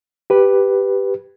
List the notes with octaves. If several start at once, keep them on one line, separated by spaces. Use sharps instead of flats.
G4 B4